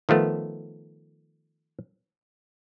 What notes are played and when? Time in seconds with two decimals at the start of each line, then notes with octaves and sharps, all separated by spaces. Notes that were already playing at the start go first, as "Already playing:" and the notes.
0.09 D#3 F3 A3 B3